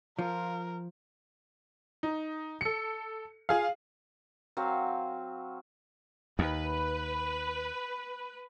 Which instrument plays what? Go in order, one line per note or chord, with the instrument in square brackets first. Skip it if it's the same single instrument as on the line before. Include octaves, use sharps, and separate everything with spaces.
[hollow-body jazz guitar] F3 [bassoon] F4 [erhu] A#4
[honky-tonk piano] D#4
A4 C#7
F4 G#4 F5
[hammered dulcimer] F#3 C4 F5
[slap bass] D#2 [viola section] B4